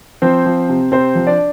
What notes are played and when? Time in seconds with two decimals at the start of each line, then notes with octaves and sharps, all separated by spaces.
0.22 F3 C4 C5
0.46 F3
0.69 C3
0.92 C3 C4 C5
1.15 F3
1.27 D4 D5